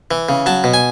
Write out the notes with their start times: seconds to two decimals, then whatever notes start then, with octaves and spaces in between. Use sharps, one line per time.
0.11 E3
0.29 C#3
0.46 F#3 A5
0.64 B2
0.74 G#5